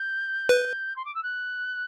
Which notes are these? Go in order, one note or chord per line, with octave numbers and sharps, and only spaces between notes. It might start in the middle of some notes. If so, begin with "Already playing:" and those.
Already playing: G6
B4
C6
D6
E6
F#6